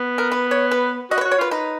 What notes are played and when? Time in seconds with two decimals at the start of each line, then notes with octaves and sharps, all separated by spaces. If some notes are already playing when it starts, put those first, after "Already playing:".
Already playing: B3
0.18 A#4
0.32 B4
0.51 C#5
0.71 B4
1.11 F#4 D#5
1.18 B4
1.21 C#5
1.25 F#4
1.31 C#5
1.38 F4 B4
1.51 D#4 B4